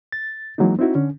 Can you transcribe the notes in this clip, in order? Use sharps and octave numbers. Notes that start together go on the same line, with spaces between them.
A6
E3 F#3 G#3 A#3 D#4
C4 D#4 E4 F#4
D3 C#4